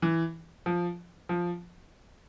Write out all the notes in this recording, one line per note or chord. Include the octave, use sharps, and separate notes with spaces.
E3
F3
F3